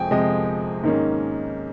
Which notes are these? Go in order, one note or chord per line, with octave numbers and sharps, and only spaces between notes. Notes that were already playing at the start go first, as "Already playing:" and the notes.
Already playing: F2 C3 F3 G#3 C4 G5 G#5
F2 C3 F3 G#3 C4 D#5
G#2 D#3 A#3 C#4